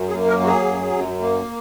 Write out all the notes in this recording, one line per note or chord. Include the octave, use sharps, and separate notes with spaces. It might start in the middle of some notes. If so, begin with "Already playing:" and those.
Already playing: F#2
G#4
A#3
A#4
F#3 F#4
G#4
F#2
F#2
A#3